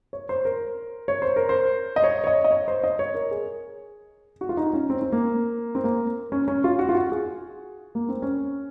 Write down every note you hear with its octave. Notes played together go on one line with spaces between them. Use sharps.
C#5
C5
A#4
C#5
C5
A#4
C5
D#5
C#5
C#5
D#5
D#5
C#5
C5
D#5
C#5
A#4
G#4
F#4
F4
D#4
C#4
C4
C4
A#3
C4
A#3
C#4
C#4
F4
F#4
F4
F#4
G#4
A#3
C4
C#4